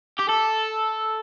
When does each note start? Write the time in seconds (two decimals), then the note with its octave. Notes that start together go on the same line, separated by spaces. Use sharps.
0.19 G4
0.29 A4